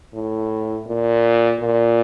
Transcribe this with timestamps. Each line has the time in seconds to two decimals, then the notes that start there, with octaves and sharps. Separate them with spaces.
0.14 A2
0.86 A#2
1.59 A#2